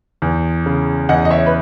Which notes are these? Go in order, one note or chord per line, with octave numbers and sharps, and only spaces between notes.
E2
C#3
E2 D#5 F#5
D#5
C#5 E5
B4